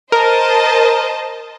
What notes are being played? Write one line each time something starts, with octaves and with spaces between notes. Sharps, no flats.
A#4 C5 D#5 A5